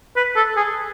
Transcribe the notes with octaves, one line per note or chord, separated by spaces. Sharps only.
B4
A4
G#4